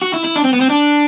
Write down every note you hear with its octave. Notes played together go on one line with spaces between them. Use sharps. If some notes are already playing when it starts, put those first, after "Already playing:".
F#4
E4
E4
D4
C4
B3
C4
D4